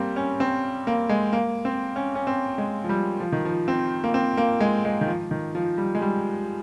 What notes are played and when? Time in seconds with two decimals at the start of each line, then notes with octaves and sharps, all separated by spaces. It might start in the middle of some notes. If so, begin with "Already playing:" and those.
Already playing: G3 A#3 C4
0.16 C#4
0.40 C4
0.87 A#3
1.09 G#3
1.33 A#3
1.65 C4
1.96 C#4
2.15 C#4
2.27 C4
2.58 G#3
2.84 F3
2.89 G3
3.20 F3
3.32 D#3
3.45 F3
3.68 C4
4.04 A#3
4.14 C4
4.37 A#3
4.60 G#3
4.85 G#3
5.01 D#3
5.07 F3
5.31 D#3
5.55 F3
5.78 G3
5.95 G#3
6.02 G3